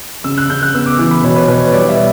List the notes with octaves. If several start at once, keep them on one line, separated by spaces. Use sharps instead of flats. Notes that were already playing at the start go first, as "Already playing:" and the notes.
C#3 E6
F#6
C#3 G6
F#6
B3 E6
D6
E3 D6
B5
B2 C#5
B4
B2 B4
C#5
G3 D5
E5
B3